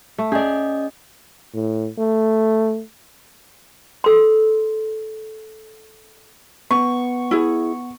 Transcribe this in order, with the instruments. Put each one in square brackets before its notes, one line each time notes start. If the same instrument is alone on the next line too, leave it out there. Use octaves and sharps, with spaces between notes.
[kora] A3
[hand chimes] C#4 D#5 [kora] G#4 D5
[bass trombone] A2
A3
[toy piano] A4 C6
[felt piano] B3 [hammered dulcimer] C#6
[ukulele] E4 G#4